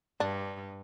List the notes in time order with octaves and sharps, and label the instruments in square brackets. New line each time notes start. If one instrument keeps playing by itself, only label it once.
[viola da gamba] G2 [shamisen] D4